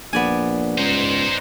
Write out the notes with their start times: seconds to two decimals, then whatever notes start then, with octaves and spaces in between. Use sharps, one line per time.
0.13 A#1 B3 D5 G#5
0.78 C#2 D#4 C5